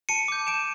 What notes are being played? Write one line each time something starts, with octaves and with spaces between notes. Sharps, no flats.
A5 C#7 D#7
D6 G6
A5 D7 E7